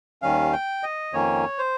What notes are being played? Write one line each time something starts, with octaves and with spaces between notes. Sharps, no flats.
D#2 D#3 G3 C#4 F5
G5
D#5
F2 D#3 A#3 C#4 C#5
C5